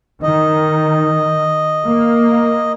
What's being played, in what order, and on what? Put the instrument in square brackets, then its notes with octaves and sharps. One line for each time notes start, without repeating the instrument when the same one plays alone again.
[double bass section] D#3 [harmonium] D#5
[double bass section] A#3